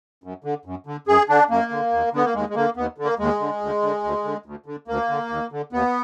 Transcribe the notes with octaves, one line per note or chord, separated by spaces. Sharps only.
F#2
D3
F#2
D3
F#2 G#4
D3 D4
F#2 A#3
D3
D#2
D3 B3
A#3
D#2 G#3
G#3
D3 A#3
D#2 B3
D3
A#3
D#2 G#3
D3
D2
D3
D2
D3
D2
D3
D2 A#3
D3
D#2
D3
D#2 B3